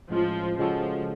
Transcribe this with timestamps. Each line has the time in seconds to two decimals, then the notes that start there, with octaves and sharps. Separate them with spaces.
0.10 A2 F3 G#3 C#4 F4
0.58 C#3 F3 G#3 C#4 F#4 A4